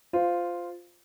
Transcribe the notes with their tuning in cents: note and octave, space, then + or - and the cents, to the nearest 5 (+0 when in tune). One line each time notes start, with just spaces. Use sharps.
F4 +0 C5 -15